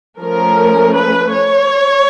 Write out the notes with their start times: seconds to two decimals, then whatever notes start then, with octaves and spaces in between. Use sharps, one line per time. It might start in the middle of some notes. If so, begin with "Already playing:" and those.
0.20 F3 A3 C#4 A#4
0.95 B4
1.33 C#5